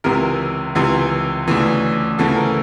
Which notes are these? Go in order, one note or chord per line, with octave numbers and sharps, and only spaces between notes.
C#2 C3 E3 A#4
C#2 C3 E3
D2 C#3 E3
D2 C#3 E3 A4
A#4